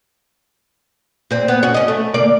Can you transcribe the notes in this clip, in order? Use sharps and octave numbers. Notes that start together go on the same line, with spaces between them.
A#2 C4
B3
C#4 F#4
C#4 D#5
A3
D2 A#3 D5